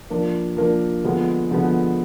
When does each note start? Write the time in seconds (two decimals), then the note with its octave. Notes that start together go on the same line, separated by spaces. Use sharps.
0.10 F3 A#3 D4
0.57 F3 A#3 D4
1.04 D3 F3 G#3 B3
1.51 D3 F3 G#3 B3